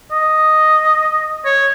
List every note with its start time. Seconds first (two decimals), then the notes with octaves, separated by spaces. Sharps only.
0.11 D#5
1.45 C#5